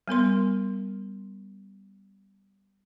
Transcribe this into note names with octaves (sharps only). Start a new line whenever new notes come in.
G3 B3 A#4 C6